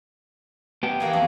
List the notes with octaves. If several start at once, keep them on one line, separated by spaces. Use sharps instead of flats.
B3 G4
E3 A#3 G#4
F2 A3 G#4